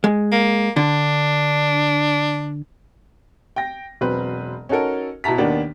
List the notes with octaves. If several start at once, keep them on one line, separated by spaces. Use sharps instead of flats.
G#3
A#3
D3 D4
G5 A#6
E1 F#3 C4 B4
C#4 D#4 F#4 A4 A#4
B2 E4 A5 A#5 B6
D#2 D#3 A#3 B3 D4